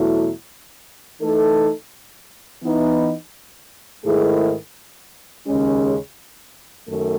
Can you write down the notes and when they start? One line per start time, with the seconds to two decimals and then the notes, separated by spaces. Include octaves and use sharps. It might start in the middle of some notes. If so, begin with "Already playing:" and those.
Already playing: E2 B2 F#3 A3 E4
1.21 E3 A3 D#4 A4
2.63 E3 B3 D#4
4.05 G#2 D#3 A3 E4 G#4
5.47 D#2 C#3 G#3 C#4
6.88 F#2 D#3 A3